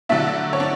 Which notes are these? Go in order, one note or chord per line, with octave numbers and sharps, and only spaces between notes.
D3 F#3 A3 D4 E4 E5
C#5
D4